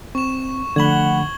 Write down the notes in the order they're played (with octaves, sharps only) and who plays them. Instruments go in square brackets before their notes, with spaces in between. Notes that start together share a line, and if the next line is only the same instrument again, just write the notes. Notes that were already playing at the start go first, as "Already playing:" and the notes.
[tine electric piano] C4 [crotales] C#6 E7
[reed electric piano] D3 [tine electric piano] F3 A3 B5 [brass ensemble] F#5 [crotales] G#6 F#7 G7